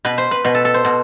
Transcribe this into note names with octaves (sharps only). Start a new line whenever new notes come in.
B2 B4
C5
B4
B2 B4
A4
A4
C5
B2